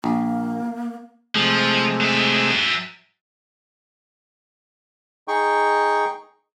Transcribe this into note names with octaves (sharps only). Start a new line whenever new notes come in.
A#1 A#3
C3 F3 G#3 A3
F#3 E5
D#4 G#4 G5 C#6